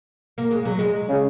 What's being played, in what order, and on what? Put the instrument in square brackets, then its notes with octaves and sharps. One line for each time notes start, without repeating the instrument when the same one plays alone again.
[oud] A#3
G#3
F#3
G#3
[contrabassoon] C#3